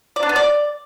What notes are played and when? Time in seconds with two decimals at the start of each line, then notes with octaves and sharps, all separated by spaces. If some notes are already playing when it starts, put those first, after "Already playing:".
0.16 D5
0.23 D4
0.29 B3
0.36 D5